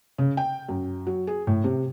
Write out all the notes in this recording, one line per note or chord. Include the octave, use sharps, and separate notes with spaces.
C#3
G5
F#2
F#3
G#4
A2
C3